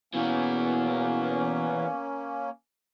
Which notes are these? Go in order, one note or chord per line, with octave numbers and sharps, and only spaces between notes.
B2 E3 A#3 B3 C#4